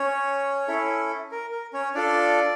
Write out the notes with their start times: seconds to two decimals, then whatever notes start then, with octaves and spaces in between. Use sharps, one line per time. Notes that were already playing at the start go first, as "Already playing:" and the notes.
Already playing: C#4 C#5
0.68 C#4 E4 A4
1.31 A#4
1.52 A#4
1.73 C#4 C#5
1.94 D4 F4 A4 D5